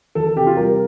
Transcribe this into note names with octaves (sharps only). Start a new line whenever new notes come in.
E3 A4
A4
C3 G4
F4
G3 A#4